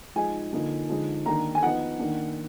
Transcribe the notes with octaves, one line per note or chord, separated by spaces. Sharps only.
F3 G#3 D#4 G#5
D3 F3 A#3 D#4
D3 F3 G#3 D#4
D#3 A#3 D4 A#5
G#5
F3 B3 D#4 F#5
D#3 A#3 D4